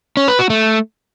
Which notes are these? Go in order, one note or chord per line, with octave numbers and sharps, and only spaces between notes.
C#4
B4
F#4
A3